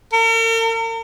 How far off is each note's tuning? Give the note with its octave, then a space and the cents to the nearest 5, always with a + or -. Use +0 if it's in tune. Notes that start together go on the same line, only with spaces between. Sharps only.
A#4 -45